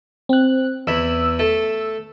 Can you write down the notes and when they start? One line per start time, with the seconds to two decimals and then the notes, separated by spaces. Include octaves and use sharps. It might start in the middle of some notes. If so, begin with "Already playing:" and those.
0.29 C4 F#6
0.87 E2 E4 B5 E6
1.39 A3 A4